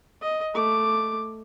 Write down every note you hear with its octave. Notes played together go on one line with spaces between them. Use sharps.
D#5
A3 D6